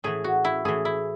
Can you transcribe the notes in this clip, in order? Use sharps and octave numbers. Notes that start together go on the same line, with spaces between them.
A2 E3 G#4
F#4
E4
A2 E3 G#4
E4